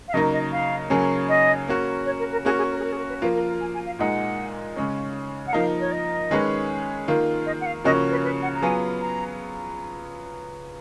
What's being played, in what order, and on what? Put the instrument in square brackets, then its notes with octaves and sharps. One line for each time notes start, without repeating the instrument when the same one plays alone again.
[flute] F5
[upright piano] C#3 F#3 A#3 D#4 A#4 [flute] D#5
[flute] D#5
F5
[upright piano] C#3 F#3 A#3 C#4 G#4
[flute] D#5
[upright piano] A#3 C#4 F#4
[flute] C#5
A#4
A#4
[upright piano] A#3 C#4 F#4 [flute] G#4
[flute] G#4
A#4
G#4
A#4
G#4
A#4
B4
[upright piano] F3 A#3 F4 [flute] B4
[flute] A#4
A#4
G#5
G#5
F5
[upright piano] A#2 G#3 D#4 [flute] F#5
[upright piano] C#3 G#3 C#4
[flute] F#5
[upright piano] F3 A#3 D#4 A#4 [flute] F5
[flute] C#5
D#5
[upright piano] D#3 G#3 C#4 G#4 B4
D#3 A#3 F4
[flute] D#5
F#5
F5
[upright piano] C#3 F3 A#3 C#4 F#4 [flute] D#5
[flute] B4
B4
F#5
A#5
[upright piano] F#3 B3 F4 G#4 [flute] G#5
[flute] A#5